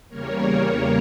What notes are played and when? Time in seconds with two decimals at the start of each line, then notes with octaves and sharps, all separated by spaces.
0.09 E2 C#3 G3 A#3 A#4 C#5